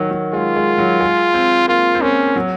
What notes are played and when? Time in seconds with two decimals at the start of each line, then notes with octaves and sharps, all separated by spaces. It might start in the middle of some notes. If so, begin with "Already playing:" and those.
Already playing: D#3 F#3
0.11 F#3
0.33 G#3 F4
0.56 G#3
0.78 F#3
1.00 G#3
1.34 C4
1.68 A#3 F4
1.95 C4
2.02 A#3 C#4
2.36 F#3